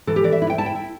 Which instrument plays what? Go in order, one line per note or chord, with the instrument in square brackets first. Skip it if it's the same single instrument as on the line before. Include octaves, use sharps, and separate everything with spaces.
[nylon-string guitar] E3 A4
G4
E3 D5
E5
E4
G5
E4 A5
G5
E4